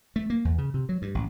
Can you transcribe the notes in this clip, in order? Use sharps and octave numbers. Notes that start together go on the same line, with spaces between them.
A3
A#3
E2
C#3
C3
F#3
G2
A1